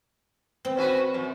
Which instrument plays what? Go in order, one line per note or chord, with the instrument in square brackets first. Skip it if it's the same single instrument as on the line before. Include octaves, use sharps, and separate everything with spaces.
[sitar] B3 [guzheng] C4
[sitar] C#4 F#4 B4
F#2